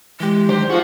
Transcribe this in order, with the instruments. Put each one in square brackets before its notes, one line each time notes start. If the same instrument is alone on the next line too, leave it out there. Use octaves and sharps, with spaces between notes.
[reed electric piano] E3 G4 [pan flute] G#3
[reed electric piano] D#3 F#3 D4 [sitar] G4 C5
[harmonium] F3 [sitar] F4 F#4 [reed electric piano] G#4